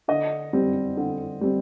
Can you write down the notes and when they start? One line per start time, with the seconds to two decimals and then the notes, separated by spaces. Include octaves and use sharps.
0.08 D3 D#5
0.53 G3 C4
0.97 D3
1.41 G3 C4